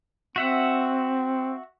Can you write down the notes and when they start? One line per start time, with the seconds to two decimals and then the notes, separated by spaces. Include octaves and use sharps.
0.36 C4 F#4 E5 F#5